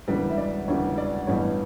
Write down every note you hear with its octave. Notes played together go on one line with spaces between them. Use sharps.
E1 D2 C#3 E3 G3 B4
E5
D5
E1 D2 C#3 E3 G3 C#5
D5
A1 G2 E3 G3 B3 C#5